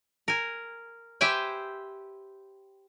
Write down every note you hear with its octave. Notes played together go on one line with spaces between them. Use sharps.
A#4 G#5
G4 B4 C5 E5 G5 G#5